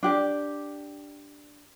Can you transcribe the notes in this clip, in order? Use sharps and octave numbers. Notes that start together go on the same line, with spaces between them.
D4 G4 D5